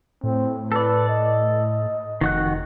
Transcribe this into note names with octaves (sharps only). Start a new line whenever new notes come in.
A2 C4
A4 B4 D5
D#5
F1 D#3 F#4 F#6